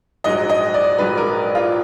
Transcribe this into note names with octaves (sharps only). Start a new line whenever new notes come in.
A#1 G#2 F#3 D#5
D#5
D5
A#1 G#2 F#3 B4
A#4
F4